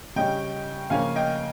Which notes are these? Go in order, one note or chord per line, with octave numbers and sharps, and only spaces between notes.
C#3 G3 C#4 D#5 G5
C#3 F3 A#3 C#4 F5 G#5
D#5 G5